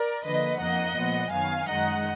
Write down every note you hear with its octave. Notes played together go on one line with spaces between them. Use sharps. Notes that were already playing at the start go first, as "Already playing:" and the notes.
Already playing: A#4 D5
D3 F3 A#3 B4 D#5
F2 F3 A#3 D#4 D#5 F#5
A#2 F3 G#3 B3
F#2 D#3 F#3 B3 F5 G#5
F#2 D#3 G#3 D#4 D#5 F#5